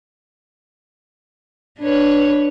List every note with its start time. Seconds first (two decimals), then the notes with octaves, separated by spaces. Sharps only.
1.80 D4 B4 C#5